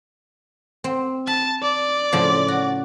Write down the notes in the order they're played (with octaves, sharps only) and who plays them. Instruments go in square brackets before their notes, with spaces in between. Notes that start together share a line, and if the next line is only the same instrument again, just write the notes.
[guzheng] C4
[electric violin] A5 [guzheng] B5
[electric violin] D5
[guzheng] A2 C#3 F3
F#4